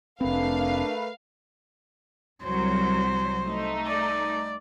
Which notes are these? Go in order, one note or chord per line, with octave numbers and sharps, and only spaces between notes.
F1 A3 C4 D4 A#4 B4 F5
C2 F#3 C5
A3 D#4
D5